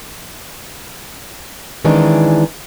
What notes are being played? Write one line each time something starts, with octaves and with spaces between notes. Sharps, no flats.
D#3 E3 G#3 C#4 D4